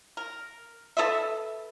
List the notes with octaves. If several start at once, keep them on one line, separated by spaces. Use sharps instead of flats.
A#4
A4 B4 D#5 E5